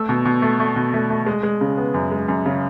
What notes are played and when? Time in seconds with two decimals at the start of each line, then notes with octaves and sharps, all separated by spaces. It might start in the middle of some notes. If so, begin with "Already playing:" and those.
Already playing: A3 E6
0.09 B2
0.25 B2
0.42 A3
0.60 A3
0.76 B2
0.94 A3
1.10 A3
1.26 G#3
1.43 G#3
1.61 C#3
1.77 B3
1.94 F#2
2.11 G#3
2.28 F#2
2.46 C#3